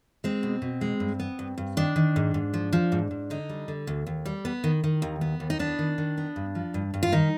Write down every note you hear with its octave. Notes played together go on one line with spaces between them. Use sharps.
G#3 C4
B2
B2
G#3
G2
B3
G2
G2
D#3 D4
D#3
G#2
G#2
F3
F3
G#2
G#2
D3 D#4
G3
D3
D2
D#2
G3
B3
D#3
D#3
D#2
B3
D#2
D#4
B3 D4
D#3
D#3
B3
G2
F3
G2
G2
F4
D#3 D#4